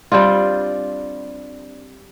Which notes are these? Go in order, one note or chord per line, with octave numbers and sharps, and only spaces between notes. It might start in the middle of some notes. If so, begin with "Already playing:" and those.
G3 C4 D4 F4